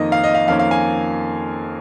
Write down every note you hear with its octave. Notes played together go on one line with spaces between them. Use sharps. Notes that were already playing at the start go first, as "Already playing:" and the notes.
Already playing: F2 D#3 A#3 D#4 D#5
F5
D#5
F5
F2 D#3 A#3 C#4 F5
F5
G#5